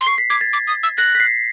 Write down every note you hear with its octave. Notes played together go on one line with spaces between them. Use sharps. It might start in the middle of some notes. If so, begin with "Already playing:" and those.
C6
C#6 C7
B6
D6 G#6
A6
D6
D#6
E6
F#6 A#6
B6
C7